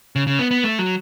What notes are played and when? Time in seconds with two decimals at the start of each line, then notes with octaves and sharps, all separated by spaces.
0.16 C#3
0.27 C#3
0.39 B3
0.51 B3
0.64 A3
0.79 F#3